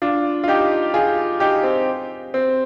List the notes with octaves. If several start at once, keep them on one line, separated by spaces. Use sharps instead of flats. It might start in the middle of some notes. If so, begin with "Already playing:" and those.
D4 F4
F4
D#4 G4
F4 G#4
D#4 G4
C4
C4